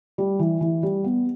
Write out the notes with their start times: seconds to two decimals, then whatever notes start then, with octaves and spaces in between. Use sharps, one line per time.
0.18 G3
0.39 E3
0.61 E3
0.83 G3
1.04 B3